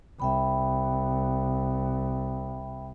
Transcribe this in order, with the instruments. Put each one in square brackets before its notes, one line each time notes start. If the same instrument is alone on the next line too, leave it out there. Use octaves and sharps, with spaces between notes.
[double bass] C2 [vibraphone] E5 G5 B5